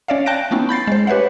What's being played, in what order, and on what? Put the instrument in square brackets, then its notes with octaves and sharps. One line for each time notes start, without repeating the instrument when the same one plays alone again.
[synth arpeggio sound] C#4 C#5 D5 E5 F5
G5 A5 F#6 G6 A#6 D7
A3 B3 C#4 D#4 E4
B5 G6 A6 C7
G#3 C5
G4 B4 C#5 E5 F#5